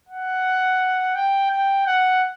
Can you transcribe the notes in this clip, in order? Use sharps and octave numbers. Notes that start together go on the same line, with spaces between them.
F#5
G5
G5
F#5